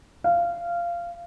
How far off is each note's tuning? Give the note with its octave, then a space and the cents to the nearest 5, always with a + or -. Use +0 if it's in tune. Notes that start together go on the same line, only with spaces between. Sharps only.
F5 -15